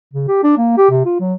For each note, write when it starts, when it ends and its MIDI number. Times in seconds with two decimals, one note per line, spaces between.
0.14 0.27 49
0.28 0.40 67
0.44 0.54 62
0.58 0.73 58
0.78 0.90 67
0.90 1.02 48
1.05 1.19 65
1.20 1.34 54